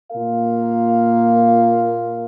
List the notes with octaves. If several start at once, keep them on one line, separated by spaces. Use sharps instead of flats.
A#2 A#3 F4 A#4 F5